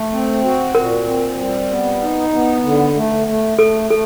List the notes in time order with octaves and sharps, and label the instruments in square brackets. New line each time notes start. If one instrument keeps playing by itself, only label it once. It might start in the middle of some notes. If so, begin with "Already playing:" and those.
Already playing: [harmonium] A3
C4
F#4
[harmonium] A#2 [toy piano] A#4
[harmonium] C4
G3
B3
D#4
B3
D3
A3
A3
[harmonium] A3 [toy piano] A4
[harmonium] A3 [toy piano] A4